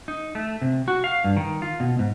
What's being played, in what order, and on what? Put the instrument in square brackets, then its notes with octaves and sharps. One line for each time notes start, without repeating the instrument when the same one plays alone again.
[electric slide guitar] D#4
A3
C3
F#4
F5
G2
D#3
F4
B2
G#2